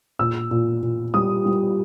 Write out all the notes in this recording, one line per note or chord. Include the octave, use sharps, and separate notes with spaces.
A#2 E6
A#2
A#2
G3 D#6
G3